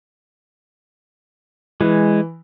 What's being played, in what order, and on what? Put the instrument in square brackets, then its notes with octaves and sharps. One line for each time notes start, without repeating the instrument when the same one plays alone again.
[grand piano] E3 [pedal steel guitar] G#3